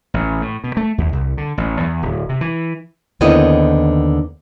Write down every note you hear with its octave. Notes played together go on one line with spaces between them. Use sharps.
A1
A2
B2
A3
D#2
C2
D3
A1
E2
D1
C3
E3
D#2 D3 B3 C4 E4 D#5